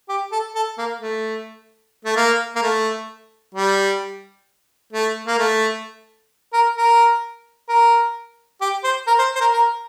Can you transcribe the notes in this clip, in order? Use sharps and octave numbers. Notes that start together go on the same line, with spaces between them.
G4
A4
A4
A#3
A3
A3
A#3
A#3
A3
G3
A3
A#3
A3
A#4
A#4
A#4
G4
C5
A#4
C5
C5
A#4
A#4